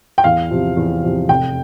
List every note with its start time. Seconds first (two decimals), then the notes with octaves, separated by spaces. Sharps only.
0.18 G5
0.24 E2 F5
0.51 C3 F3
0.77 E2
1.03 C3 F3
1.29 F1 G5